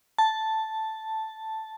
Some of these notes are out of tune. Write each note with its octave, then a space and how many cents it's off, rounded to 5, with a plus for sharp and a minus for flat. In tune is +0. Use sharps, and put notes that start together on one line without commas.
A5 +0